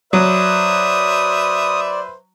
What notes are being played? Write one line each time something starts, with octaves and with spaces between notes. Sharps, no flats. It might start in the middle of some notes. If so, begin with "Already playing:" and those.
F#3 B4 C5 D5 E5 D#6